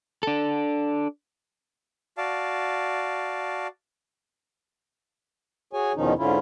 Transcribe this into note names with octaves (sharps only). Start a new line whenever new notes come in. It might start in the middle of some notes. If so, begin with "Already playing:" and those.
D4 A4
F#4 D5 F5 A5
F#4 G#4 C#5 G#5
E2 B2 D#3 F3 C#4 D#4
G#2 D3 C#4 E4 F4